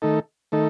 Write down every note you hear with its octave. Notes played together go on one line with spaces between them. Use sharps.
D#3 A3 D#4 A4
D#3 A3 D#4 A4